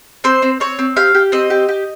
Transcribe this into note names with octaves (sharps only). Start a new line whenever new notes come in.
C4 C5
C4
C4 C#5
C4
G4 F5
G4
C4 D#5
G4
G4